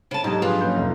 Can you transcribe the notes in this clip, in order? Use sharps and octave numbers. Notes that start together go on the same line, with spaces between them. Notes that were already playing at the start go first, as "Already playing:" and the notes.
C#3 C5 A5
D2 G#2 F#3 G4 D#5 G#6
G2 F3 D4 F4 G#4 B4
F#3 A#3 C#4 G6
F1